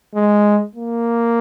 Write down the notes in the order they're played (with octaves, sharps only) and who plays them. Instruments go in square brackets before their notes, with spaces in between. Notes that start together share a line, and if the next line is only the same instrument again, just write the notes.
[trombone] G#3
A#3